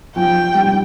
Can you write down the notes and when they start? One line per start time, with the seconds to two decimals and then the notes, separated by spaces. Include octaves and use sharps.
0.16 F3 G5
0.54 G3